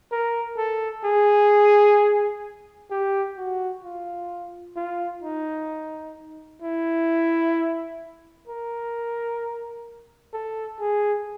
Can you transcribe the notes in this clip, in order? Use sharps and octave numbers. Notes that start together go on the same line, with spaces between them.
A#4
A4
G#4
G4
F#4
F4
F4
D#4
E4
A#4
A4
G#4